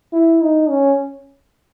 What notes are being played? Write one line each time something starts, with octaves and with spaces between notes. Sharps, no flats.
E4
D#4
C#4